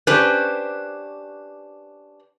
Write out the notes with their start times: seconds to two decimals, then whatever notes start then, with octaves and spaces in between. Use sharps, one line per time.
0.07 C#4 D4 G4 B4 C5